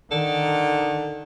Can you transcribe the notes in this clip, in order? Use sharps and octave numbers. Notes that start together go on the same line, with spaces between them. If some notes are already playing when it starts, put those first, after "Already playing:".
D3 D#3